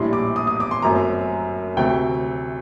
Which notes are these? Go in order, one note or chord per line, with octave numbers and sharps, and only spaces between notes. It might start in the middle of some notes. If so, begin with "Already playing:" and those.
Already playing: A#1 A2 G3 D4 C6
D6
D#6
D#6
D6
C6
G1 F#2 F#3 A3 C4 A#5
D2 C3 F#3 A3 C4 G5